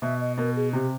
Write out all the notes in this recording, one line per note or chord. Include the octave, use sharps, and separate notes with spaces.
B2 E5
D#5
B2 A#4
G#4
C3 G4